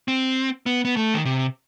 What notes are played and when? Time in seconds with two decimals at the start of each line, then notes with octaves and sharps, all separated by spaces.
0.08 C4
0.66 B3
0.85 B3
0.97 A3
1.14 D#3
1.25 C3